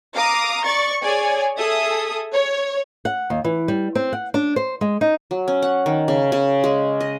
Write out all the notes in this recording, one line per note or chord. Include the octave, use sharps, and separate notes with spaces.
F5 A#5 D6 D#6
D5 C#6 A6
G#4 C#5 D5 G#5
G#4 A4 E5 D#6
C#5
F#5
D#2
E3
G3
C4
F#5
D4
C5
G#3
D#4
F#3
C#4
F#5
D#3
C#3
C#3
G#3
D#5